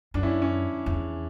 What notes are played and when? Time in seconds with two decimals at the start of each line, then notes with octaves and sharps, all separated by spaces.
0.14 F#2 D4
0.23 C#4 E4
0.42 C#4
0.86 E2